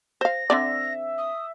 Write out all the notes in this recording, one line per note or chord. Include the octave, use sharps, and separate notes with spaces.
C5 F5 A#6
D3 C4 D5 E5
D#6